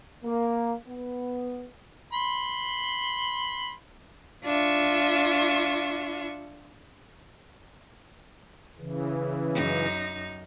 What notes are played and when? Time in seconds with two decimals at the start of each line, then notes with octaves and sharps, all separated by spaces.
0.24 A#3
0.87 B3
2.13 B5 C6
4.44 D4 F4 E5 C#6
8.79 C#3 E3
9.55 F#2 D#4